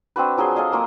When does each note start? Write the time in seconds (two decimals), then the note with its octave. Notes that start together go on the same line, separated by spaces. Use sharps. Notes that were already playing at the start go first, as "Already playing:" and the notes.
0.16 C4 D4 F#4 B4
0.37 F3 F#3 G#4 C6
0.56 A4 D#5 F5 G#5
0.72 F#3 A#3 C6 D6